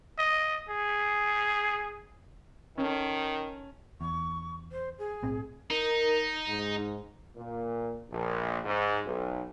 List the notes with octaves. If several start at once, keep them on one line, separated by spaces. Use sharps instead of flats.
D#5
G#4
D#3 C#4 A4
E2 C#6
C5
G#4
B1 A2 C4
D#4 A#4
G#2
A#2
A#1
G#2
B1